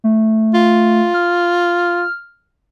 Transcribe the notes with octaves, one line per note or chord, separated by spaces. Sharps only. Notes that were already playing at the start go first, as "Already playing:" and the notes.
A3
F4
F6